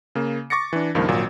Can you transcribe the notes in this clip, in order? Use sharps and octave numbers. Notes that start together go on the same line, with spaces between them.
C#3 A#3
C#6 D6 A6 A#6 C#7
E3 D4
C#2 G2 D#3 F3 A#3
G#1 A#2 F#3